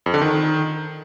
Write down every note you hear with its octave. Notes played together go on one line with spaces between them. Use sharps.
F2
D3
D#3